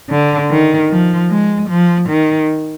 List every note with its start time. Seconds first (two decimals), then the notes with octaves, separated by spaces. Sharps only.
0.10 D3
0.50 D#3
0.91 F3
1.31 G#3
1.70 F3
2.10 D#3